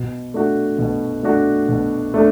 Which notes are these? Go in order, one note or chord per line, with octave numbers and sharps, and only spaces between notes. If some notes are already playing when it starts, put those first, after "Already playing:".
Already playing: B2
A3 D4 F#4
B2
A3 D4 F#4
B2
A3 D4